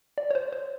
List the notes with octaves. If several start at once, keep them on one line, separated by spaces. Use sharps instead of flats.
D5
C#5
C5
C5